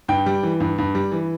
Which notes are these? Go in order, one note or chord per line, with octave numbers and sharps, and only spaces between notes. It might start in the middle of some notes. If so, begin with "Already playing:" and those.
G2 G5
G3
E3
G2
G2
G3
E3